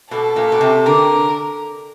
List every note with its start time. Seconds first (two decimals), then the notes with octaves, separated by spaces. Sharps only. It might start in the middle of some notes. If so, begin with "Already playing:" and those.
0.10 B2 A4
0.36 A#2
0.52 B2
0.61 C3
0.86 D3 A#4